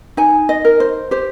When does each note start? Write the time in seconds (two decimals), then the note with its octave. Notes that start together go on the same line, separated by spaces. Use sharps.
0.17 D#4 G#5
0.49 D#5
0.65 A#4
0.80 C5
1.11 G4 C5